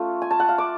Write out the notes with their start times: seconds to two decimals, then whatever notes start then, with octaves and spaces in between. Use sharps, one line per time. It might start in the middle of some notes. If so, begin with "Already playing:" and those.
Already playing: A3 C#4 F4 F5
0.22 G#5
0.31 A5
0.40 F#5
0.49 F5
0.58 D6